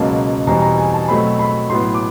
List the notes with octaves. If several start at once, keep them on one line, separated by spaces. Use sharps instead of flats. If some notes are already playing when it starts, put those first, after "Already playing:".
Already playing: C#2 B2 F#3 A#3 A5
E2 B2 G3 C4 A#5
A#5
G#5
A5
B2 F#3 A3 C4 B5
B5
A2 F#3 B3 C6
D6